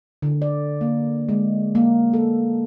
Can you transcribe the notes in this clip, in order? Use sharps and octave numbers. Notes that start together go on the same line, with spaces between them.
D3
D5
A#3
G#3
A#3
A4